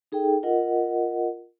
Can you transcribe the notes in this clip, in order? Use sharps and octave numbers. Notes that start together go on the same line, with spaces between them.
D#4 G#4 A4 G5
F4 A#4 D#5 F#5